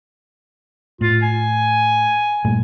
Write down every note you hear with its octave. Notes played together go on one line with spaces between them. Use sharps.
A2 F4
G#5
G2 A#2 A3